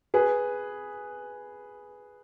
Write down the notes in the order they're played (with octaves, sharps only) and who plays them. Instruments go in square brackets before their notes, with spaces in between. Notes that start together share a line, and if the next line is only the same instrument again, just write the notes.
[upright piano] G#4 B4